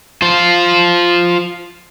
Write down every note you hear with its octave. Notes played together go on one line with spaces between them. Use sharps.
F4 C5